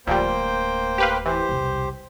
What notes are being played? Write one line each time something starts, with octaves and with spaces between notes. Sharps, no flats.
D1 D2 A#2 F3 G3 A#3 C5 G5
G4 B4 F5
E3 G4 C5
E1 C2